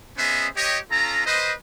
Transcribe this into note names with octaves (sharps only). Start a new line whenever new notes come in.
B3 C#4 G#4 C5 D#5 E5
G4 C#5 D#5
C#4 F4 A4 A#5
B4 C5 D#5